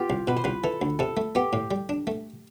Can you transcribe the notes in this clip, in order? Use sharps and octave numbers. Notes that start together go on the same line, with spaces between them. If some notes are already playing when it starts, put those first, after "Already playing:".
Already playing: B3 F4 G4
C2
B2 B4
C5
C2 B4
E3 A4
D2
C3 A4
A3
B3 G4
A2
G3
D4
A3